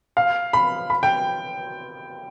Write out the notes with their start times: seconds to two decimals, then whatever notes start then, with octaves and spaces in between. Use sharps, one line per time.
0.17 F5
0.53 B5
0.90 B5
1.03 G5